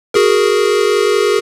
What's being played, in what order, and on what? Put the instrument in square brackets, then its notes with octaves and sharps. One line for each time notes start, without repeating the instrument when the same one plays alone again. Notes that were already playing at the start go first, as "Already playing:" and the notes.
[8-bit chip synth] F#4 G#4 A#4